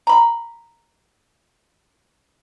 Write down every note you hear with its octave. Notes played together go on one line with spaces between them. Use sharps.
A#5 B5